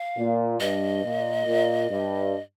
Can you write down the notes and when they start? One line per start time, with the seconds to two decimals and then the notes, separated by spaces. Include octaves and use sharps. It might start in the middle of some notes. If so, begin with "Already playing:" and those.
Already playing: F5
0.17 A#2
0.60 G2 D#5
1.04 A#2
1.47 A#2
1.90 G2